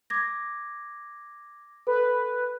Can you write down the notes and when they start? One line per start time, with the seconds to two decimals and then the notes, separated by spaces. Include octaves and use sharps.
0.10 D6 G#6 A#6
1.87 A4 B4